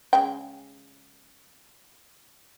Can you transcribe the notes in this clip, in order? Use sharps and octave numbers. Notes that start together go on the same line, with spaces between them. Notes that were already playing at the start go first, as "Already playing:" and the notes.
C#3 G#3 G5